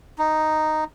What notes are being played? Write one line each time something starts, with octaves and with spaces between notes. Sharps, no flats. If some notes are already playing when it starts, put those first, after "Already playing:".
D#4